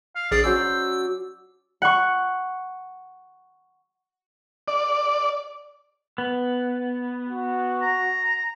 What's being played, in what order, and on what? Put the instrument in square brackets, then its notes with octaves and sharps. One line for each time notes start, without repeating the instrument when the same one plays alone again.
[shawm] F5
[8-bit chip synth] A#1 G#4 C7 [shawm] D5
[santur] F#3 C#4 D5 [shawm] C5 [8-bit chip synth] E6
[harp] F#5 C#6
[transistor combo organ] D5
[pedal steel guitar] B3
[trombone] F#4
[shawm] A#5